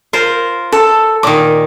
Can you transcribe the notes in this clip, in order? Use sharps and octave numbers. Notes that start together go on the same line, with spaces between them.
F4 A#4 C5
A4
A#2 D#3 D6